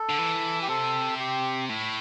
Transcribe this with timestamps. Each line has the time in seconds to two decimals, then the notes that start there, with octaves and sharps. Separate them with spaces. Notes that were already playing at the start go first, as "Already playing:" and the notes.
Already playing: A4
0.10 D3
0.19 E3
0.62 G4
0.68 C3 A4
1.20 G4
1.69 A2